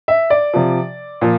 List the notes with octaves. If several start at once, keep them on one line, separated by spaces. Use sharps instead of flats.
E5
D5
C3 F3
A#2 F3